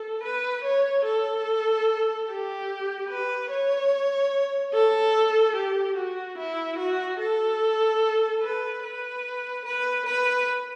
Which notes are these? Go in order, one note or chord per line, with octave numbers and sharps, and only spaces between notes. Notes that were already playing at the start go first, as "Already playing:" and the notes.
Already playing: A4
B4
C#5
A4
G4
B4
C#5
A4
G4
F#4
E4
F#4
A4
B4
B4
B4
B4